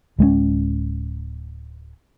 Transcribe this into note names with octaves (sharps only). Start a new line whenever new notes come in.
D1 G#3 A3 C#4